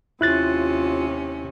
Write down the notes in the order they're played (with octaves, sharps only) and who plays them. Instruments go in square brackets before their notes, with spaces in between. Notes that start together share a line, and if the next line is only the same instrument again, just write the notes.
[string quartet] D#2 C3 C#4 [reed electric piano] E4 F#6 A6 [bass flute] F4